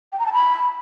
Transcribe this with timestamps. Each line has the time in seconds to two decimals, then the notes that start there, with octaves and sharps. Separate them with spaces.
0.12 G5
0.19 A#5
0.26 A5
0.33 B5